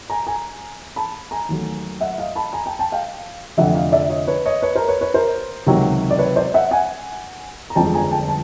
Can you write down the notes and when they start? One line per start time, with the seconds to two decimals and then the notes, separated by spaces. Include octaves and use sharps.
0.10 G#5 A#5
0.27 G#5 A#5
0.96 A5 B5
1.31 G#5 A#5
1.49 D#2 D#3 F#3 A3
2.00 E5 F#5
2.18 D#5 F5
2.36 A5 B5
2.53 G#5 A#5
2.66 G5 A5
2.79 G5 A5
2.92 F5 G5
3.57 F1 F2 D3 E5 F#5
3.75 D#5 F5
3.92 D5 E5
4.10 C#5 D#5
4.27 B4 C#5
4.45 C#5 D#5
4.62 B4 C#5
4.75 A#4 C5
4.88 B4 C#5
5.01 B4 C#5
5.14 A#4 C5
5.67 C#2 C3 D#3 F#3
6.11 D5
6.19 B4 C#5
6.36 C5 D5
6.54 E5 F#5
6.71 F#5 G#5
7.70 A#5
7.76 G1 F2 D3 F3 G#3 G5 A5
7.94 G#5 A#5
8.11 G5 A5
8.28 A5